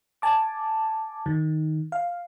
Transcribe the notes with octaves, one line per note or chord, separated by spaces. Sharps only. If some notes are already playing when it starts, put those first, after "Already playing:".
G#5 A5 D6
D#3
F5